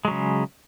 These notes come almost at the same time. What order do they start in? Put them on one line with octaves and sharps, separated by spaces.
G#3 F#3 C#3